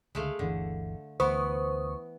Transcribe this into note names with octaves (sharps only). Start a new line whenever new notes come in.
C#2 D3 G#3 A3 F5
G1 D2 D3 E3
D2 E3 B3 C5 C#6 D#6